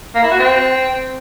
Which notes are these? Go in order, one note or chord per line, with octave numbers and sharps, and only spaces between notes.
A#3
E4
F#4
C4